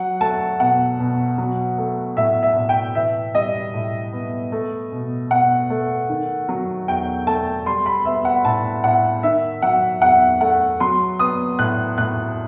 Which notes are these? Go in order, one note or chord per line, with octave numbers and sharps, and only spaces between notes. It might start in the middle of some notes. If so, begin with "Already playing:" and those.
Already playing: F#3 F#5
A3 A5
B2 F#5
B2
F#3
A3
A2 E5
E5
A2
G5
E3 E5
G3 D#5
A2
B3
A3
B2
B2 F#5
A3
D#3
F#3
E2 G5
A3 A5
G3 C6
B5
B3 E5
F#5
A2 A5
A2 F#5
D#3 E5
F#3 F#5
E2 F#5
A3 F#5
F#3 C6
B3 D#6
A2 F#6
A2 F#6